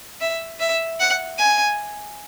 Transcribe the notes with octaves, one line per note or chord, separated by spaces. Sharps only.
E5
E5
F#5
G#5